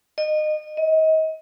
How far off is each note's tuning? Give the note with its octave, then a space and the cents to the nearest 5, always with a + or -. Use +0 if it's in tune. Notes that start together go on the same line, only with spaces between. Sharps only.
D#5 -25
D#5 +30